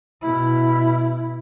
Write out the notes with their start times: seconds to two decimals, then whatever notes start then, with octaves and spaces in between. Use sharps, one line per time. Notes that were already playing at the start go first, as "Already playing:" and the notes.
0.22 B2 E4